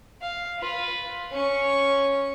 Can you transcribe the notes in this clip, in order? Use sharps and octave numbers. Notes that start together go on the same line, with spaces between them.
F5
F4 B4
C#4 C#6